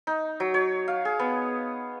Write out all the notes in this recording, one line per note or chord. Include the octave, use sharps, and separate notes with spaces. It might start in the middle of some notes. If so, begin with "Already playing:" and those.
D#4
F#3
C#5
F5
G#4
B3